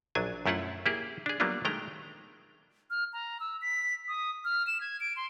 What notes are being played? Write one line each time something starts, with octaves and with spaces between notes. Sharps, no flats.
A#1 F#3 D4 G#5
F#2 A3 E4 F4 F#5
A#3 E4 G4 G#4
D4 G#4
F#3 G3 A#3 B3 D4 F4
D#3 G#3 A3 G5 A#5
F6
A#5
E6
B6
D#6
F6
E7
G#6
D7
C6